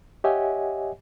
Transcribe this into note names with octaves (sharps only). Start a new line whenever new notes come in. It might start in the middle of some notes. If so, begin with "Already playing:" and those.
G4 C#5 D#5 E5 F#5 G#5